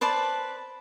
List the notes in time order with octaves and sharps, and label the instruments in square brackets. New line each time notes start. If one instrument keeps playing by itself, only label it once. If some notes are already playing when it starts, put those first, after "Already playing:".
[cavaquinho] B4 C5 D5 A5